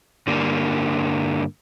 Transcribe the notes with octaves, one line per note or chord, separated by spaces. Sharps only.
G2 D3 G3 A#3